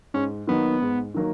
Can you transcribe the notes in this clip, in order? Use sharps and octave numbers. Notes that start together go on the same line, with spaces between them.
G#2 C#4
D#3 F#3 A#3 B3 D#4
G#2
D#3 F#3 A#3 D#4